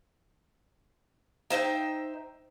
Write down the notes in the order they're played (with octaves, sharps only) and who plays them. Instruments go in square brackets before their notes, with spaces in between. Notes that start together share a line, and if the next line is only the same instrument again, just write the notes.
[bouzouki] D#4 C5 E5 G5